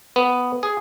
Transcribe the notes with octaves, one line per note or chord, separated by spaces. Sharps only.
B3
G#4